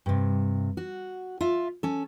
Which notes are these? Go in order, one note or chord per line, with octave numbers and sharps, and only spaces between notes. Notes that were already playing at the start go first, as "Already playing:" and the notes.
G2 C3
F#4
F4 E5
C#4 A4